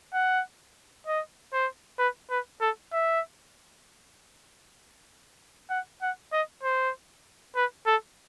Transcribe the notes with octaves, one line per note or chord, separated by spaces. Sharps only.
F#5
D#5
C5
B4
B4
A4
E5
F#5
F#5
D#5
C5
B4
A4